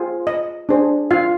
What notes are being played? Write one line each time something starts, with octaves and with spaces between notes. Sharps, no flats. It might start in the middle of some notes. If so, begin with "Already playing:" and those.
Already playing: F4 G#4 C5
D#5
D4 G#4 C5
F4 F5